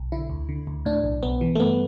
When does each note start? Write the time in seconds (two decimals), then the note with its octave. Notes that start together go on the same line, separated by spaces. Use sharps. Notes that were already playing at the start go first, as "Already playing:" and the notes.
Already playing: B1
0.12 D3 E4
0.30 D2
0.49 D3
0.67 D2
0.85 A2 D4
1.04 B1
1.23 B1 B3
1.41 E3
1.55 A3
1.60 G2 B3